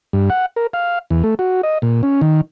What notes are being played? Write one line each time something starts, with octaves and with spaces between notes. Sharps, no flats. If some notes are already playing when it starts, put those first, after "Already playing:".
G2
F#5
A#4
F5
E2
A3
F#4
D#5
A#2
C#4
D#3